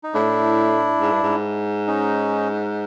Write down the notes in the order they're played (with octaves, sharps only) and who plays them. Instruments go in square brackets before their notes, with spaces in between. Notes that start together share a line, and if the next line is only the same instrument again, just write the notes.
[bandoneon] D#4
[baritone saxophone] A2 [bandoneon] D4 E4
[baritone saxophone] G#2
G2
G#2
[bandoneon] C#4 D#4